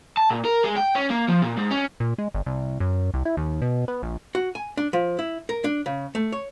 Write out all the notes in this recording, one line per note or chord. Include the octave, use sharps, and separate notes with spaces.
A5
A#2
A#4
G#3
G5
C#4
A#3
F3
A#2
G#2
C#4
A#2
G#3
G1
C2
F#2
C2
E4
D#2
B2
B3
A#1
F#4
G#5
D4
F3
E4
A#4
D4
C#3
A3
C#5